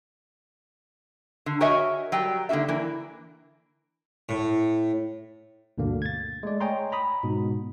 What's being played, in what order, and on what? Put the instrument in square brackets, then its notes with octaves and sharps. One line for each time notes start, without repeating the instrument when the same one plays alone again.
[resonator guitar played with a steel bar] D3
F#4 A#4 C#5 D#5 E5 G#5
F#3 G3 G5
D3 A#3 D#4 F#4 E5
E3 A#3
[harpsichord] A2
[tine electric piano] D2 G2 B2 D3 A#3
G#6 A6
G#3 A3 D5
C#5 D#5 G5 G#5 A#5 C6
A#5 B5 D#6
G#2 B2